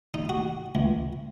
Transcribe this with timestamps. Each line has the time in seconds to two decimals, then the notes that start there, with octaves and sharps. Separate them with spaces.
0.14 D#4
0.29 F#4
0.75 C#2